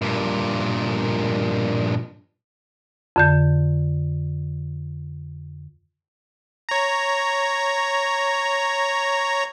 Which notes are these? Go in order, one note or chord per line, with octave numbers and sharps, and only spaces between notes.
G2 A#2
F2 D3 G6
C#5 A#5